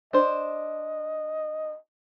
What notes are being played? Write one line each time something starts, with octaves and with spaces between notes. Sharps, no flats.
D4 C5 D#5